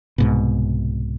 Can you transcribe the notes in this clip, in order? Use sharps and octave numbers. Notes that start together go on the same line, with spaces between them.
C2 G#2 B2